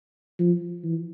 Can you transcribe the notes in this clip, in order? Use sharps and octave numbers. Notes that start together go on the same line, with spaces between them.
F3
E3